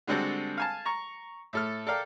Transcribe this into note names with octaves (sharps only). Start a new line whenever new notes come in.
D3 G3 G#3 C4 F#4 A4
F5 G#5 A5
A#5 C#6
A2 A4 F6
A4 A#4 D5 F5 G5